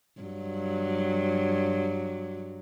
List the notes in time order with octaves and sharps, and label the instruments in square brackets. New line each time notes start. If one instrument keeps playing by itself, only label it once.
[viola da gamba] G2 F#3